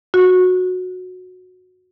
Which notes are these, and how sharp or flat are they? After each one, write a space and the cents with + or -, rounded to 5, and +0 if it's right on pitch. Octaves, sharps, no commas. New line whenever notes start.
F#4 -15